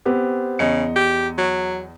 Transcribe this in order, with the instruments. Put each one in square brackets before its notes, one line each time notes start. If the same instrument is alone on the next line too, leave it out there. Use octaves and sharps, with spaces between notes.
[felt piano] B3 C4 G4
[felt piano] E2 D#5 C#7 [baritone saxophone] C#3
[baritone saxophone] G4
F#3